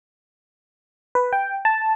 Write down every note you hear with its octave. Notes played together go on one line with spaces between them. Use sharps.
B4
G5
A5